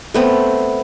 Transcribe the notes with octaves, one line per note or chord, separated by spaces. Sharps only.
A3 B3 C4